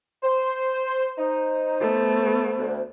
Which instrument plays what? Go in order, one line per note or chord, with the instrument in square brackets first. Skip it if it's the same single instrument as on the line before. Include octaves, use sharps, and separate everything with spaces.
[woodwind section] C5
[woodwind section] D#4 [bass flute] C5
[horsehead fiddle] A3 B3
[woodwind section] D2